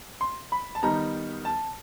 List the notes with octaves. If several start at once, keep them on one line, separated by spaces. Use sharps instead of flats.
C6
B5
A5
D#3 G3 B3 D#4 A#5
A5